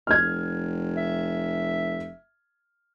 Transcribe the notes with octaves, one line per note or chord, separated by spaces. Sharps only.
F1 F6 G#6
E5